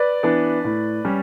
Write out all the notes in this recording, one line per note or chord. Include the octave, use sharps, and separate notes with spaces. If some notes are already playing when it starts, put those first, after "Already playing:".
Already playing: B4 D5
E3 B3 D4
A2
G3 C#4